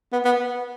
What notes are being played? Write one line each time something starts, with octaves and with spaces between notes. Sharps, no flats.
B3
B3